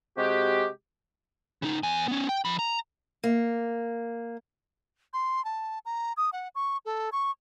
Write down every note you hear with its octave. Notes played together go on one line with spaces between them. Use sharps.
C3 G#3 F#4 G4
C#3 D#4
E2 G#5
B3 C#4
G5
F3 B5
A#5
A#3
C6
A5
A#5
D#6
F#5
C#6
A4
C#6